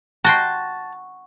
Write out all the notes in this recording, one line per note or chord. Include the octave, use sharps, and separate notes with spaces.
F#4 G5 A5 C6